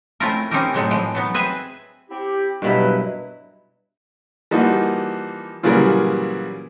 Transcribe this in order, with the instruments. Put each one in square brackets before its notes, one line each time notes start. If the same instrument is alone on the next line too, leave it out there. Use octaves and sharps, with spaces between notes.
[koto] A3 C4 C#4 E4 F4 A#4
C4 C#4 D#4 E4 G4 A#4
A2 F#3 G#3 A3 C4
A2 E3 F3 G#3 G5
F#3 B3 D#4
C4 G#4 B4 E5 G#5
[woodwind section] C4 E4 G4
[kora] G2 B2 E4 [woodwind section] D#3 F#3 B4
[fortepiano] E3 F3 G3 A#3 D#4 F#4
A#2 C#3 E3 F#3 G3 A#4